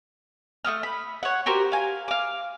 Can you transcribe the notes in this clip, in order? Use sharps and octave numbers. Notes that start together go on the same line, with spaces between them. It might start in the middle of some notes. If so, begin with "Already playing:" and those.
A3 A#3 D#6 F6
B5
C#5 F#5
F#4 G4 A#4 C5
F5 G#5
F5 D6